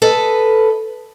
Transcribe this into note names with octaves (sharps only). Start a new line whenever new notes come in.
A4 B4 D#5